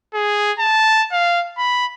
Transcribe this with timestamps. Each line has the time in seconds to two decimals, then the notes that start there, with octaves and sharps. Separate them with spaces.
0.14 G#4
0.59 A5
1.12 F5
1.57 B5